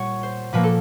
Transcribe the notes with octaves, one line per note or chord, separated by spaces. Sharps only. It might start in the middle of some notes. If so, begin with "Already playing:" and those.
Already playing: A#2 G3 C#5 F#5
C5
A#2 F3 A#3 B4
A4